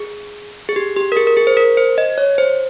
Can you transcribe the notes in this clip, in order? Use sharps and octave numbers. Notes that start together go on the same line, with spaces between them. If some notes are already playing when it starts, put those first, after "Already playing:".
Already playing: G#4
G#4
G4
G4
A#4
G#4
A#4
G#4
C5
A#4
C5
D#5
C#5
C5